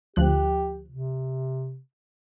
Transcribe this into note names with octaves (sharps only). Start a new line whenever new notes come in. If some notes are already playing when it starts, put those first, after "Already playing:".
D2 F3 G4 F#6
C3